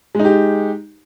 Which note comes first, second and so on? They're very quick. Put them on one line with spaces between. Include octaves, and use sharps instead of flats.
G#3 D#4 G4